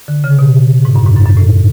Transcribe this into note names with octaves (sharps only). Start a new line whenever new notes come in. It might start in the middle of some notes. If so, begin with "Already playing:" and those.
D3
C#3
B2
G#2
F#2
G#2
F#2
F#2
A2